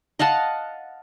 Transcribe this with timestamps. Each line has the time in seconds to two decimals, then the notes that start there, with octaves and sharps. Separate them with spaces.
0.19 D#5 F5 F#5 A5